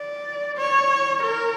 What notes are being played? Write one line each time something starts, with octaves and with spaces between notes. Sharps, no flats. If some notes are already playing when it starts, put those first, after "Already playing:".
Already playing: D5
C#5
A#4